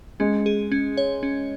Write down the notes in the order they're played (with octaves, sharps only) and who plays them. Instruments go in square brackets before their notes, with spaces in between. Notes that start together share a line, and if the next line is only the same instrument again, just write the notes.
[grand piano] G#3 [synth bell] C#4
[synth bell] G#4
C#4
C#5
C#4